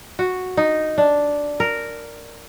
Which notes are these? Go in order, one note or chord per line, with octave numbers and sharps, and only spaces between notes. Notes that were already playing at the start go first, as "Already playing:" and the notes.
F#4
D#4
D4
A#4